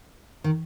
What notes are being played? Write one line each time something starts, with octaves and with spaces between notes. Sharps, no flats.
D#3